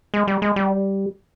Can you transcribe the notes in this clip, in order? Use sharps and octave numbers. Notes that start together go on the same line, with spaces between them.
G#3
G3
G#3
G3